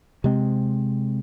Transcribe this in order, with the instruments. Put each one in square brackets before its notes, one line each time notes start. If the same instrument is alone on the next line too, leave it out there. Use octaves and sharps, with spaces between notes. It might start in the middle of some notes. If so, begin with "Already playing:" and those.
[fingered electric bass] C3 G#3 C4